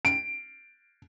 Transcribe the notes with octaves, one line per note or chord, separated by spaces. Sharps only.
D7